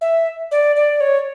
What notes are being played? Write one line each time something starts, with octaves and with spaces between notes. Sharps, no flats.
E5
D5
D5
C#5